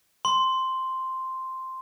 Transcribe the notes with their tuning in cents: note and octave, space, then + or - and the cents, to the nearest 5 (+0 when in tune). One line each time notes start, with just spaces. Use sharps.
C6 +0